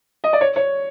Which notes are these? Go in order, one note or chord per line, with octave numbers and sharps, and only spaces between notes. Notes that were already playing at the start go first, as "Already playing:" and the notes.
D#5
D5
C#5
C#5